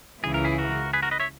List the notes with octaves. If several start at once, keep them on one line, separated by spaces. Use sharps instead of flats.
C#2 C#3 E3 G#4
A#4
E4 G#4
F#4 A#4
G#4 B4
F#4 A#4
B4 D#5
C#5 E5